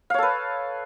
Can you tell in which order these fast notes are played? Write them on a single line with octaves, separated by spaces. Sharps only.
F5 C#5 A4 B4